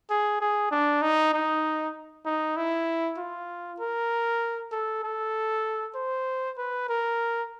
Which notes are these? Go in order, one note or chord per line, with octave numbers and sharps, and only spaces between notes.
G#4
G#4
D4
D#4
D#4
D#4
E4
F4
A#4
A4
A4
C5
B4
A#4